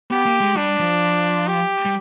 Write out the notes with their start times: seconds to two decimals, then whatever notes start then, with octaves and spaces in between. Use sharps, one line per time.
0.11 B3 G4
0.26 A#3
0.41 G#3
0.56 G3 D4
0.79 F3
1.48 G4
1.85 G3